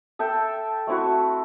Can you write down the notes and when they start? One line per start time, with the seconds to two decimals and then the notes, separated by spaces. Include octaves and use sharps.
0.19 A4 E5 G5
0.87 A3 C4 E4 F#4